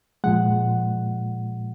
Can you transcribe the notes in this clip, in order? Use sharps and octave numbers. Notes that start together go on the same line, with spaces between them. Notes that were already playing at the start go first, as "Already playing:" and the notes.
A#2 F3 G#3 F#5